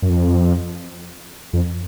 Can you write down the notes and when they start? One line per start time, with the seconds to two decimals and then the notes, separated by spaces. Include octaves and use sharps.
0.02 F#2
0.10 F2
1.53 F2